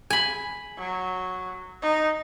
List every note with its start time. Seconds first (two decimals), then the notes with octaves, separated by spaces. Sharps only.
0.10 G#5 B5
0.78 F#3
1.82 D#4